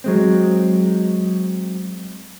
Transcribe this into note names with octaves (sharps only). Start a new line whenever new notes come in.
F#3 G#3 C4